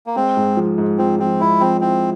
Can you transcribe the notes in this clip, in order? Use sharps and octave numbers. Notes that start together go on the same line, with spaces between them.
A#3
G#3 C4
G#2
F3
G#2
F3 C4
F3 C4
G#2 E4
F3 C4
C4 E4